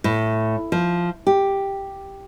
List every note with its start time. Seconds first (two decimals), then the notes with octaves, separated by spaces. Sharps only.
0.04 A2
0.72 F3
1.27 G4